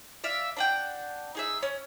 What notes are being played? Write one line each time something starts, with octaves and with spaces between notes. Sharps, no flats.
D5 E5 F5
D4 F#5 G5
D#4 G#4 E5
C#4